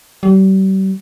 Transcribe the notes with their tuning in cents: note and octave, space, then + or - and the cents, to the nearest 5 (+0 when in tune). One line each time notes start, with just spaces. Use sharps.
G3 -40